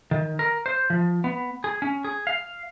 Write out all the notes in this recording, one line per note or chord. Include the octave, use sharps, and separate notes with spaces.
D#3
A#4
C5
F3
B3
G#4
C#4
G#4
F5